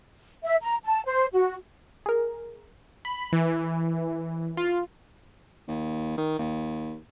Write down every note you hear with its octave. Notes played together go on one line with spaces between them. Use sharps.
E5
A#5
A5
C5
F#4
G#4 A#4
B5
E3
F4
D#2
D#3
D#2